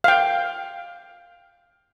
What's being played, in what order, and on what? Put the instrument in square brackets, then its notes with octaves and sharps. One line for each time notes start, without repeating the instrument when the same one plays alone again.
[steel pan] F5 G5